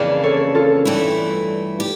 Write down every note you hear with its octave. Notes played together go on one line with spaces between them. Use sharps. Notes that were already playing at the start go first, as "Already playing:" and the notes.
Already playing: F2 C#3 E3 A#3 D4
A4 C#5
F4 A4
G2 E3 A3 E4
G4